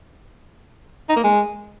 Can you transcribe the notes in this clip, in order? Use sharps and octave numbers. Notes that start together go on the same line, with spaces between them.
D#4
A#3
G#3